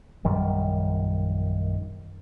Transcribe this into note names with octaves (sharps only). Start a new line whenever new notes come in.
A#1 F#2 D#3 G3